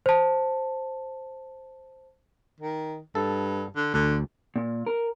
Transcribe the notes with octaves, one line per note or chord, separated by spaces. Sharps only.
C5 A5
D#3
G2 A4
D3
D2 D3
A#2
A#4